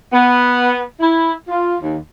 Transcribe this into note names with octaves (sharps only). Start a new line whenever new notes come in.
B3
E4
F4
D#2